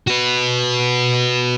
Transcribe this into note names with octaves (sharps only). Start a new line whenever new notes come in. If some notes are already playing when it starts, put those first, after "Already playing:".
F#4 B4